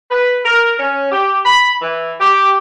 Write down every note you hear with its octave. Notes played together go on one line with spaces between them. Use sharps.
B4
A#4
C#4
G4
B5
E3
G4